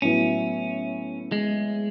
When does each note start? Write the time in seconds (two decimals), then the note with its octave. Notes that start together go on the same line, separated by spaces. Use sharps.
0.02 A2 F#3 B3 C#4 E4
1.32 G#3